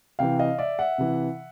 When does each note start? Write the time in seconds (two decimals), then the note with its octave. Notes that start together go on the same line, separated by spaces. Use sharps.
0.19 C3 E3 F5 G5
0.39 D#5 F5
0.58 D5 E5
0.79 E5 F#5
0.98 C3 E3